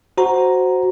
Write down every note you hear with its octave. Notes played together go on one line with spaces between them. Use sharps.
F#4 C5 A#5